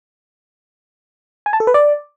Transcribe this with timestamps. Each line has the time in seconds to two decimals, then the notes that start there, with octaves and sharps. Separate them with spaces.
1.46 G#5
1.53 A5
1.60 A4
1.67 B4
1.74 D5